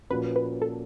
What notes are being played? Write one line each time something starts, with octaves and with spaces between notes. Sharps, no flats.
A#2 F3 A#3 C#4 F#4 B4
B4
A4